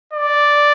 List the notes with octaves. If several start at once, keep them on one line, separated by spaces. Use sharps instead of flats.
D5